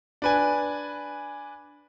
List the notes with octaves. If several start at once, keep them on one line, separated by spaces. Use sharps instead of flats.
D4 B4 G#5